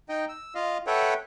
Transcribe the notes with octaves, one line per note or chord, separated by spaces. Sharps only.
D#4 D#5 G5
E6
F4 D#5 F5
A4 B4 C#5 E5 F#5 G5